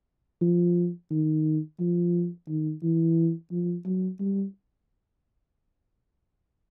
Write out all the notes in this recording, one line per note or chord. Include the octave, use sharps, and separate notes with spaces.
F3
D#3
F3
D#3
E3
F3
F#3
G3